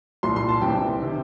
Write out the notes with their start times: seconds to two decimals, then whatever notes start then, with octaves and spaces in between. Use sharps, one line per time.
0.23 C2 A#2 C6
0.36 C6
0.49 A5
0.62 C2 C3 E3 G5
1.00 C3 D#3